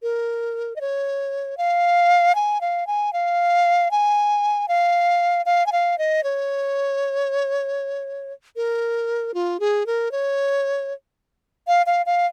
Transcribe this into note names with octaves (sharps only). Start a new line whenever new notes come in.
A#4
D#5
C#5
F5
G#5
F5
G#5
F5
G#5
F5
F5
G#5
F5
D#5
C#5
A#4
F4
G#4
A#4
C#5
F5
F5
F5